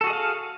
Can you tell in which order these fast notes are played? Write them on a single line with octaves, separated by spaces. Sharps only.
A4 F#4 G#4 D#5 F5